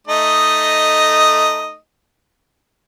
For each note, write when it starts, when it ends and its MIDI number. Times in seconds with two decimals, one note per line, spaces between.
0.07 1.76 57
0.07 1.76 63
0.07 1.76 75